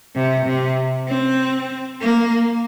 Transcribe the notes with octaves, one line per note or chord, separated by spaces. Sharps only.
C3
C3
C4
A#3